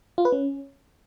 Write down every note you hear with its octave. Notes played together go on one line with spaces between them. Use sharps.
F4
B4
C#4